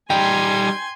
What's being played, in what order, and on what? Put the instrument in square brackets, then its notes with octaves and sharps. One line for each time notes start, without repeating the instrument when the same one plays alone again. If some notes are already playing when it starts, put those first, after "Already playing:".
[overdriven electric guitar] G3 D#4 [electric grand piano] G5 [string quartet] G#5 C6 G#6